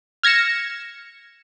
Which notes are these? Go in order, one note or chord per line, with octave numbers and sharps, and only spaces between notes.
F6 G#6 A#6 C#7 E7